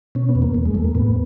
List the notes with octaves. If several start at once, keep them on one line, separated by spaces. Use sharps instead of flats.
B2 C#4
B3
E2
A#3
E2
G#3
E2 A3
A#3
A2 B3